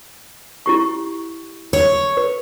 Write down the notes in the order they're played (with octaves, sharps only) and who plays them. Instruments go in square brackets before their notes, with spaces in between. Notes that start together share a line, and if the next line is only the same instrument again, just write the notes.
[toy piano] E4 G4 C#6
[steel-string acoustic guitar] C#5
[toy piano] B4